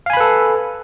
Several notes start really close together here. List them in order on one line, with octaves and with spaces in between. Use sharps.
F5 G#5 B5 B4 A4